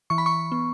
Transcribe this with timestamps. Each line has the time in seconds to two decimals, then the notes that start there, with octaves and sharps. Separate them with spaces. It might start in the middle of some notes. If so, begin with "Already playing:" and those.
0.10 E3 C#6
0.18 B5
0.26 C#6
0.52 B3